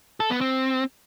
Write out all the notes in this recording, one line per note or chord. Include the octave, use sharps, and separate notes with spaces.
A4
B3
C4